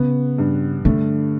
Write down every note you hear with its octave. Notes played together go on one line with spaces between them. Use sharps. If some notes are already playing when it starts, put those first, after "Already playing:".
Already playing: C#3 B3
G2
D3 A3